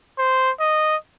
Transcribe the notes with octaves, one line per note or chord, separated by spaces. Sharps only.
C5
D#5